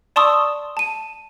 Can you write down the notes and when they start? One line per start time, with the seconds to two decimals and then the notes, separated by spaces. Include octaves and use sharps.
0.16 D5 A5 C6 C#6 D#6 E6
0.77 A5 D#7